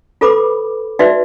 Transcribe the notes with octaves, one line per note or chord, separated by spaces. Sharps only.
F4 A4 B4 C5 B5 D6
D#4 F#4 B4 D5 E5 F5